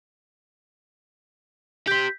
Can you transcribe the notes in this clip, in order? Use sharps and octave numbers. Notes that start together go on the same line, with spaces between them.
G4 C5 G6 B6